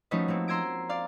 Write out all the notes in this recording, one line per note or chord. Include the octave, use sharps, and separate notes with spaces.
F3 A3 C#4 D#4 F#4 B4
A3 A#3 C4
A#5 C6 E6 G#6 A#6 D7
D5 F5